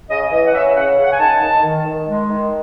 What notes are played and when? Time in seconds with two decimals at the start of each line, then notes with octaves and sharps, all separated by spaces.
0.10 C#3 D#5
0.32 E3 D#5
0.46 F#5
0.54 C#3 E5
0.76 C#3 F#5
0.98 C#3 F#5
1.11 G#5
1.19 D#3 A5
1.42 D#3
1.63 D#3
1.86 D#3
2.08 G#3
2.29 D#3